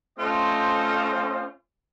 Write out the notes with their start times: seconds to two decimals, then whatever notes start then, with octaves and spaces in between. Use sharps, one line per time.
0.19 A3 C4 C#4 F4 C5 D#5